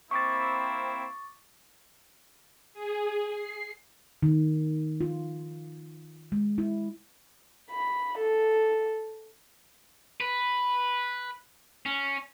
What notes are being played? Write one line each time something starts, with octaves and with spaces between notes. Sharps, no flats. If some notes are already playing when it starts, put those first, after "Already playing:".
A#3 C4 E4 C#6 D6 A6
G#4
C7
D#3
F4
G#3
E4
B5
A4
B4
C#4